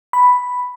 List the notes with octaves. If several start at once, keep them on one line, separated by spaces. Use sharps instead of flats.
B5